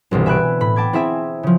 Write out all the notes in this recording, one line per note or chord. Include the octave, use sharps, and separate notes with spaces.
G1 C2 B2 E3
E5 G#5 B5 F#6 D7
A2 B5
G5 A5 D6 G#6
C4 E4 G#4 E5 G#5
C#3 F3